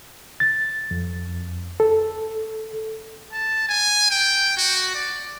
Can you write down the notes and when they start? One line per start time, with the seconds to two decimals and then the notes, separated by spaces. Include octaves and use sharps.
0.40 A6
0.91 F2
1.80 A4
3.33 A5
3.69 G#5
4.11 G5
4.57 F#4
4.94 D5